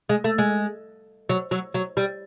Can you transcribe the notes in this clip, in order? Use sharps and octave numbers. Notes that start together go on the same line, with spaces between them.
G#3
A3
G#3
F#3
F#3
F#3
G3